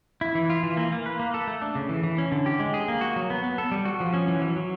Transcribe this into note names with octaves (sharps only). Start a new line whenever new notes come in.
E4
E3
F4
E3
A#3
A#3
B4
A#3
A4
A3
D4
C#3
E3
E3
C#4
D3
G4
G#3
G#4
A#3
F#4
F#3
B3
B3
A4
G3
F#4
F3
C#4
E3
F#3
F#3